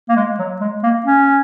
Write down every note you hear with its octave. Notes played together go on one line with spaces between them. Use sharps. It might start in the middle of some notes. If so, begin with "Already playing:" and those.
A#3
G#3
F#3
G#3
A#3
C#4